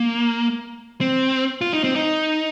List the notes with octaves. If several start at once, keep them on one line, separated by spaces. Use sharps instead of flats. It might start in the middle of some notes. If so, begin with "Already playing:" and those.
Already playing: A#3
C4
F4
D#4
C4
D#4